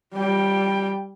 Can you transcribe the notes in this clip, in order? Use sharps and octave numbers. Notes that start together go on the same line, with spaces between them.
G3 G5